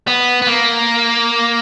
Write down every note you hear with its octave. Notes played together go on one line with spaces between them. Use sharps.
B3
B3
A#3